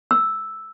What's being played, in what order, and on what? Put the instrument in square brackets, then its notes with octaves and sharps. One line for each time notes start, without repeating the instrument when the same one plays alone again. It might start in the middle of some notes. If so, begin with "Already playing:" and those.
[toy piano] E6